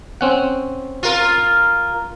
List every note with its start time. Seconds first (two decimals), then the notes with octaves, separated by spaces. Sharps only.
0.21 C4 C#4 F#5
1.03 F4 A#4